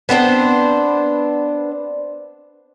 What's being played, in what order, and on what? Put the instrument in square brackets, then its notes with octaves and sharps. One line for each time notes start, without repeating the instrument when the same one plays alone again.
[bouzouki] B3 C4 D4 C5